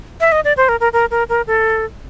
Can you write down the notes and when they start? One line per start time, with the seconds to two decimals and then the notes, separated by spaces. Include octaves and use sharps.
0.20 E5
0.32 D#5
0.45 D5
0.57 C5
0.69 A#4
0.80 A#4
0.93 A#4
1.11 A#4
1.29 A#4
1.47 A4